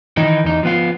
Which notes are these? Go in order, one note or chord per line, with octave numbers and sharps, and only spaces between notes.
D#3 E3 D#4
E2 D#4
F3 B3 F4